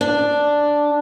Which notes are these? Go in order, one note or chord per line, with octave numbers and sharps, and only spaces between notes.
D4